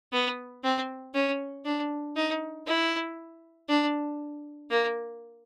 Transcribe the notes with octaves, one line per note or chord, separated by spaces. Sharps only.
B3
C4
C#4
D4
D#4
E4
D4
A#3